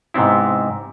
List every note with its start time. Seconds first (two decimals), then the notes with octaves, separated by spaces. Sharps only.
0.14 G#2 C3 B3 C4 E4